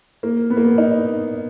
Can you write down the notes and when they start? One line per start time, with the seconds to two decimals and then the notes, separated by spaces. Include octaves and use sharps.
0.23 A#3
0.50 B3
0.57 A#3
0.64 B3
0.78 D#4